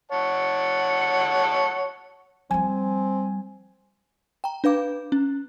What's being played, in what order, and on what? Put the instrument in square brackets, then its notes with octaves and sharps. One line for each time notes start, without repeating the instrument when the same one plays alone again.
[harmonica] C#5 F#5 A5
[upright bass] F3 G3 [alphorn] C4 [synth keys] G#5
[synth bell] G5 A#5
D4 B4 F5 D6
C#4